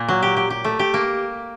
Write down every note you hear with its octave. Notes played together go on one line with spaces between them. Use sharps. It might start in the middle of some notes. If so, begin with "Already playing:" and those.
Already playing: A#2 A#3
F#3
G4
G4
G4
A3
G4
A#3